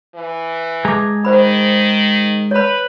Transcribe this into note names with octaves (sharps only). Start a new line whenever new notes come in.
E3
G#3 G#4 A5 A#5 D6
D#3 C5 B5
B4 C#5 B5